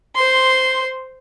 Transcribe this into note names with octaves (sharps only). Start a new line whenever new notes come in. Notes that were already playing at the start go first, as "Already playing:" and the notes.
C5 C6